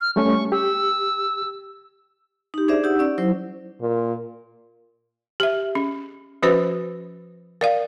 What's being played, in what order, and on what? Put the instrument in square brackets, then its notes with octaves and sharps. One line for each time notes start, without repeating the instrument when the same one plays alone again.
[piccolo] F6
[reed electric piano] G3 A3 C#4 [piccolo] C#6
[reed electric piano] G4 [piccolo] E6
[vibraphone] D#4 G4
D4 G#4 C5 D5 E5
D#4 G4 F#5 E6
C#4 D5 E6
F#3 E4 C5
[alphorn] A#2
[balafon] G4 E5
C#4
F3 C#4 F#4 B4 C5
A#4 D5 F5